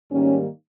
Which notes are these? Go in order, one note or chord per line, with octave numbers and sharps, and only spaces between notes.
G#2 D#3 G3 A#3 C#4